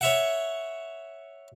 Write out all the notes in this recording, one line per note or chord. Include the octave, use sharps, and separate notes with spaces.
C#5 E5 F#5